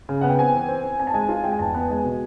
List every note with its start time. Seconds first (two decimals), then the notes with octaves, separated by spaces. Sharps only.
0.09 C#3
0.21 B3 F#5
0.29 G5
0.39 C4 G#5
0.54 E3
0.69 C4
0.84 C4
0.99 C4 G#5
1.07 A5
1.14 G#3 G#5
1.29 F4
1.44 G#3 G5
1.52 G#5
1.59 E2 A5
1.74 B3
1.90 G#3 G#5
2.04 B2